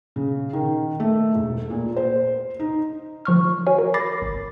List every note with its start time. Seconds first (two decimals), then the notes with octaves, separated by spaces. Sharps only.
0.16 C#3
0.53 D#3
1.00 A3
1.35 E1
1.70 A#2
1.96 C5
2.59 D#4
3.25 D#3 F3 C#6 F6
3.66 F#4 C#5 G#5
3.79 A#4
3.94 B5 D6 A6 A#6 C7
4.22 G#1